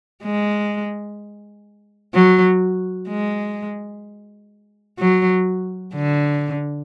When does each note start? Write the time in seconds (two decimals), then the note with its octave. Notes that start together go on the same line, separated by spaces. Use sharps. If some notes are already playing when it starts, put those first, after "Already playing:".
0.24 G#3
2.14 F#3
3.09 G#3
4.99 F#3
5.95 D3